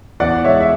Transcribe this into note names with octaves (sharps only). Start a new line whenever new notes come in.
E2 D5 F#5
G#3 C#5 E5
E5